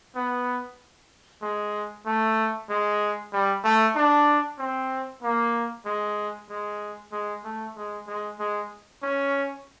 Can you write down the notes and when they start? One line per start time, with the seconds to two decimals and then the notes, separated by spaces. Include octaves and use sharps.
0.16 B3
1.42 G#3
2.06 A3
2.70 G#3
3.33 G3
3.64 A3
3.95 D4
4.59 C4
5.23 A#3
5.86 G#3
6.50 G#3
7.12 G#3
7.44 A3
7.77 G#3
8.07 G#3
8.40 G#3
9.03 C#4